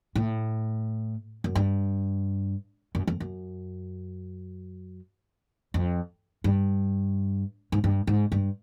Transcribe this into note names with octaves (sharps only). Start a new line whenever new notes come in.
A2
F#2
G2
F#2
F2
F#2
F2
G2
G#2
G2
G#2
G2